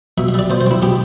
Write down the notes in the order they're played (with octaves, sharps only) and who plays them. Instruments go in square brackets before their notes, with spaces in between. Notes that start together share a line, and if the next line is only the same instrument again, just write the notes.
[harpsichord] B2 E5
E5
G3 D5
B2 C5
C5
C4 E4
B2 G4